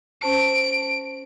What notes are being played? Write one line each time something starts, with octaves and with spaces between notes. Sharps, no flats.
C#4 C5 A5 D7